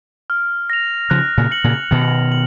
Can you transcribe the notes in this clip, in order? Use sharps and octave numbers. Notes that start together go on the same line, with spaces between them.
F6
A#6 F7
C#3 F3 F#6
A#2 C#3
A#6 C#7 F#7
A#2 C#3
B2 D#3 F#6
F#7